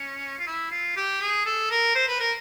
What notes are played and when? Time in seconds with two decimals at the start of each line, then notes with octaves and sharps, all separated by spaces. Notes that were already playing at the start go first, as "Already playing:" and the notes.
Already playing: C#4
0.39 F4
0.47 E4
0.71 F4
0.96 G4
1.21 G#4
1.46 A4
1.71 A#4
1.95 C5
2.08 B4
2.20 A#4